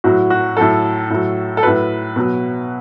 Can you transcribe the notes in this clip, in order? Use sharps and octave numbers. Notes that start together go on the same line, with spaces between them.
A2 F#3 F#4
F#4
A2 F#3 A4
A2 F#3
A4
A2 F#3 B4
B2 F#3